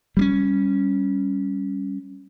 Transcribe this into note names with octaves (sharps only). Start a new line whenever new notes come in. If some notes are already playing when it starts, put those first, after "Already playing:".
G3 A#3 C#4